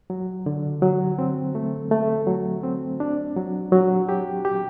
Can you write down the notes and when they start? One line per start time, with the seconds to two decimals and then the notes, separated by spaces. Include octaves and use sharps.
0.10 F#3
0.46 D3
0.82 F#3
1.19 C4
1.55 A3
1.91 A3
2.27 F#3
2.63 C4
3.00 D4
3.36 F#3
3.72 F#3
4.09 G4
4.45 G4